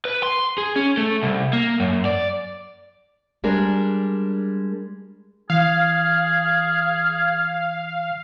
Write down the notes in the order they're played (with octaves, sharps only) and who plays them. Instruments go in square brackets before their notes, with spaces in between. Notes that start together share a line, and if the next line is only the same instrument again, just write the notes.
[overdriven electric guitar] B4
C6
G#4
C#4
A3
C2
A#3
F#2
D5
[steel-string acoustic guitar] G3 G#3 D4 A#4
[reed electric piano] E3 [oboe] G#4 [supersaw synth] F5 [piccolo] F6